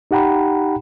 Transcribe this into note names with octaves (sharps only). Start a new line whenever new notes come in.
D#4 G4 F#5 G5 A#5 B5